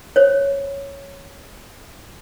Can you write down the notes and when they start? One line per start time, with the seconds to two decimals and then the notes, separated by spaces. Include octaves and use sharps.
0.16 C5 C#5